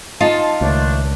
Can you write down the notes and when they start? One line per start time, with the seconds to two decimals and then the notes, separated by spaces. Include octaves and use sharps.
0.21 D#4 F4 A5
0.61 C#2 D#3 A3 D4